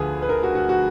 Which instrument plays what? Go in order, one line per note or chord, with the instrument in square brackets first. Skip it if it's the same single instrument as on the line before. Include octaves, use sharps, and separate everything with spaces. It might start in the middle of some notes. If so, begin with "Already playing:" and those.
Already playing: [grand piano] D2 D3 F3 G#4 B4
B4
A#4
F#4
F#4
F#4